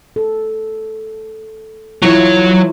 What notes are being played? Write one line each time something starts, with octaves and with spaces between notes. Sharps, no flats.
A4
E3 F#3 E4 F4 C#5